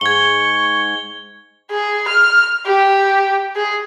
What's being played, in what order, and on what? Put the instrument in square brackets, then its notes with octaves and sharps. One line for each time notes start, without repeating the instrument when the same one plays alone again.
[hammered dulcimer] G#2 [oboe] C#6 [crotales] G#6 G7
[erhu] G#4
F6
G4
G#4